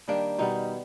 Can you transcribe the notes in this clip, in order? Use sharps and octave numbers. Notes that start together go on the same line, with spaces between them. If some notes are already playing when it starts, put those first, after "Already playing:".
D#3 G3 A#3 D4
B2 G3 B3 D#4